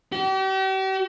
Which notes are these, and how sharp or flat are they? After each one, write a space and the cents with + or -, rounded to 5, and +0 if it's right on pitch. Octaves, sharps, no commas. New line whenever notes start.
G4 -40